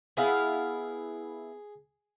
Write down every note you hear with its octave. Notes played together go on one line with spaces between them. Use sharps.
B3 E4 G#4 F5